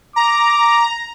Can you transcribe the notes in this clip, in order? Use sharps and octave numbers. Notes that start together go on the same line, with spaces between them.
A#5 D6